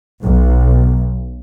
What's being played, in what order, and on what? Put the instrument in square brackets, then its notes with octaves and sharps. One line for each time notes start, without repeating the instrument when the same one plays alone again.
[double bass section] B1